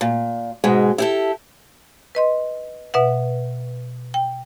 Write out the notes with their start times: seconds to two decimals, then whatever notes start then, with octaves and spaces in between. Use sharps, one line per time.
0.01 A#2
0.64 G#2 B2 G#3
0.98 E4 G4 A4
2.15 B4 D#5 C6
2.94 B2 B4 E5 F#5
4.14 G5